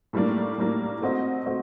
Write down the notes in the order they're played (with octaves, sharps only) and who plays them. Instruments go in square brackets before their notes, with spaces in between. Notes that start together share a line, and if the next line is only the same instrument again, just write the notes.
[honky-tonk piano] A2 G3 A#3 D4
A2 G3 A#3 D4
A3 C4 F#4 C5 D#5
A3 C4 F#4 C5 D#5